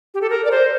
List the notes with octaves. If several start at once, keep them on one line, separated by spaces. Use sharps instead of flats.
G4
A4
A#4
D5
C5